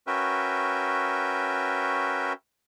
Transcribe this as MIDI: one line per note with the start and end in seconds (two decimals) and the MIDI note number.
0.07 2.33 61
0.07 2.33 66
0.07 2.33 70
0.07 2.33 71
0.07 2.33 76
0.07 2.33 79